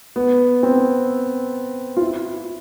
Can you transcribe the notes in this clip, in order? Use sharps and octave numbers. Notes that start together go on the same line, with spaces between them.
B3
C4
F4
E4